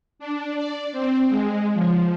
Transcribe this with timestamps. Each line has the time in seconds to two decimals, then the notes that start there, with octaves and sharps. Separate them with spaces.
0.19 D4
0.56 D5
0.92 C4
1.29 G#3
1.74 F3